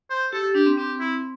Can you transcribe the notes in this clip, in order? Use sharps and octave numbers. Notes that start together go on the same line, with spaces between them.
C5
G4 A4
G4
D4 G4
C4
C4 G4
E4